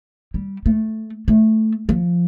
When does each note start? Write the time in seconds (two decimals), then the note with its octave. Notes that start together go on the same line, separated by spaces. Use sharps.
0.34 G3
0.66 A3
1.28 A3
1.89 F3